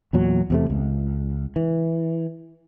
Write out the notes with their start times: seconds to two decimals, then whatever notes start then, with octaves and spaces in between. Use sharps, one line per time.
0.13 E2 A#2 F#3
0.50 E2 C3 A3
0.70 C#2
1.56 E3